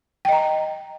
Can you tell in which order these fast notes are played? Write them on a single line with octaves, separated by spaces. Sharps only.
G5 D#5 A#5